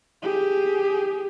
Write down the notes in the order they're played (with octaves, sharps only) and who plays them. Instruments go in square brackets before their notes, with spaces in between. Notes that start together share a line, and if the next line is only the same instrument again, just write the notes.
[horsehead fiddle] G4 G#4